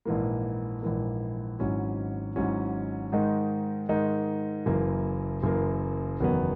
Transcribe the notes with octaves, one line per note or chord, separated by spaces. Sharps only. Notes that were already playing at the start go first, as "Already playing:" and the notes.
A#1 G#2 E3 A#3
A#1 G#2 E3 A#3
G#1 G#2 F#3 C#4 E4
G#1 G#2 F#3 C#4 E4
G#2 D#3 G#3 D#4
G#2 D#3 G#3 D#4
F#1 F#2 E3 A#3
F#1 F#2 E3 A#3
F#1 E2 D#3 F#3 B3